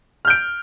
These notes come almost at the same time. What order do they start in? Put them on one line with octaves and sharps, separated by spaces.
F6 G6 D7